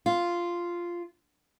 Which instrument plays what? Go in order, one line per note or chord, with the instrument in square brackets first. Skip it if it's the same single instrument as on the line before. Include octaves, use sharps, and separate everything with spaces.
[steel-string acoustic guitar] F4